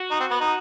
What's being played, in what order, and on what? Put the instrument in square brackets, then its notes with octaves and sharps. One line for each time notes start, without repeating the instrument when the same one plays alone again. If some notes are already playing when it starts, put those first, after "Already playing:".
Already playing: [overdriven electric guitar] F#4
[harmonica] D#4
C4
B3
D#4